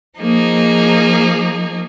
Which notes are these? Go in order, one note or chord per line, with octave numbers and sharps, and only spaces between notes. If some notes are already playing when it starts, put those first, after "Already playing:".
F3 A#3 D#4 G#4